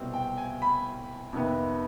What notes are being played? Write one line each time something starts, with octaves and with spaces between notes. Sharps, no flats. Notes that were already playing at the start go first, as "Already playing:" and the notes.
Already playing: C2 B2 G3 C4
G5
G#5
B5
F2 C3 D#3 B3